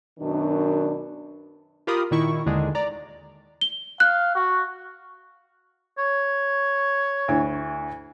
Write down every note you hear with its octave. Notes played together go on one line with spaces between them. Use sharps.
F#2 B2 D#3 D4
F4 G4 A#4 B5 D#6
A#2 D#3 E4 C#6
D#2 D3 D#3 G#3
D5 A#5
G7
F5 F#6
F#4
C#5
D2 E4